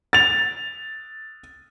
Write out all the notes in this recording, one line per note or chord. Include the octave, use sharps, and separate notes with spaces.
A6 F7